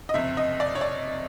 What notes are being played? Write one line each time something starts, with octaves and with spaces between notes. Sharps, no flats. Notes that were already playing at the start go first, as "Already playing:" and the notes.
D#5
F#1 F2 C3 E5
D#5
D5
C#5
D5